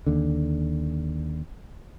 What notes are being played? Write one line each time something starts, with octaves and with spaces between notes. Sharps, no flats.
D#2 D3